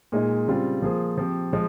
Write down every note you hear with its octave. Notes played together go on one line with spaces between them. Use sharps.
A#2 G#3 D#4 G#4
C#3 G3 C4 F4
F3 A#3 F4 G#4 C5
F3 C4 G4
F3 G#3